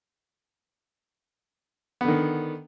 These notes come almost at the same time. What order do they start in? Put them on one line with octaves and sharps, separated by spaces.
B3 D3 D#3